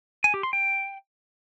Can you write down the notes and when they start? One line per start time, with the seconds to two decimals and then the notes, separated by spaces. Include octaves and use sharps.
0.24 G#5
0.34 G4
0.43 C6
0.53 G5